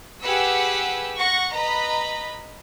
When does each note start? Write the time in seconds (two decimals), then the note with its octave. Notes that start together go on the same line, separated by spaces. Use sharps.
0.23 G4 G#4 B4 F#5 E6
1.18 F#5 C#6 A#6
1.53 B4 D#5 A#5 B5